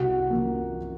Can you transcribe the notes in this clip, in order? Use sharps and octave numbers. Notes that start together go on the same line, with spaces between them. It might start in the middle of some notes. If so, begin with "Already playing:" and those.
Already playing: C2 F#4 F#5
C3 F3 A#3